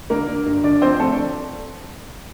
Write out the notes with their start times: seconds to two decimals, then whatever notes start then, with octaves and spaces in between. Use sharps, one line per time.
0.10 D3 A#3 A#4
0.28 D3
0.46 G2
0.63 D3 D4 D5
0.82 F3 C4 C5
0.99 F3 A3 A4
1.11 D4